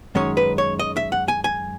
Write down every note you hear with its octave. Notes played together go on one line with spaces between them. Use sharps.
F#2 D#3 G#3 C#4 C#5
B4
C#5
D#5
E5
F#5
G#5
G#5